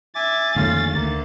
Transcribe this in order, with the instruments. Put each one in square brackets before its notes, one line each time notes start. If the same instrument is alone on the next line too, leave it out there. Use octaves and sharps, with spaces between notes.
[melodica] E5 G#5 D6 [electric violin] A6
[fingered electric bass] F2 A#3 [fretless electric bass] D3 D#3 A3 [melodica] C#4 F5
[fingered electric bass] D2 [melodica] A#3